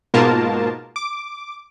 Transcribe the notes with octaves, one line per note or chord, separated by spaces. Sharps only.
G#2 B2 A#3 F4 A#4 A5
D6